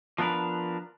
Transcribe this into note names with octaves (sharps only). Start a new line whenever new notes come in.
F3 B3 D4 A#4 B4